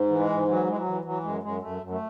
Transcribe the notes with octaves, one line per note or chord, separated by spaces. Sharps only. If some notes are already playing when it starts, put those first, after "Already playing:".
Already playing: G#2
E3
G#3
G#2
E3 F#3
E3 G#3
F#3
E3
E3 F#3
F#2 G#3
F#2 G#3
F#2 A3
F#2
A3